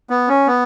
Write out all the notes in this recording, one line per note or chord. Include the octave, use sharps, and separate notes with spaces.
B3
C#4
B3